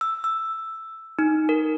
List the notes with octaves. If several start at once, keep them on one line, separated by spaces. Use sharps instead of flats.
E6
E6
D#4
A#4